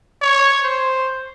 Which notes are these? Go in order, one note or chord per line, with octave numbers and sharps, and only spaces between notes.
C#5
C5